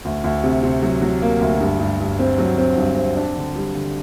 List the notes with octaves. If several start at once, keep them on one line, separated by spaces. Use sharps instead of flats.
D2
D2
C3
C3
F#3
F#3
A#3
D2
G2
G2
G2
C4
F#3
C4
G2
C4
D4
D3
G3
D3